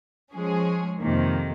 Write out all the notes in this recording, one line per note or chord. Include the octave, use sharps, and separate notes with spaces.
F3 G#3 C#4 G#4
F2 C3 D#3 A#3